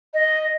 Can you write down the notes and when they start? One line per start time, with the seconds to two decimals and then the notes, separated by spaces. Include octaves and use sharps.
0.14 D#5